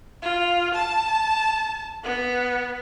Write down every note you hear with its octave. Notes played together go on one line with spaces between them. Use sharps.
F4
A5
B3